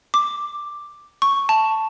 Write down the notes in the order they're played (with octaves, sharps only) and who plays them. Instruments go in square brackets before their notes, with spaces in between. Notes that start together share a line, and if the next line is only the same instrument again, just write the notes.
[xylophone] D6
C#6
A5